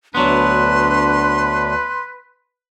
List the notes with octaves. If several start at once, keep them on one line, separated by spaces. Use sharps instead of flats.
D2 F#3 B3 D4 B4 C6